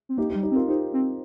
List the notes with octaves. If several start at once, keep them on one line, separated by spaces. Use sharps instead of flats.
C4
A#3 D#4 G4
D#4 G4
G3
D#4 G4
C4
F4 A#4
D#4 G4 C5
C4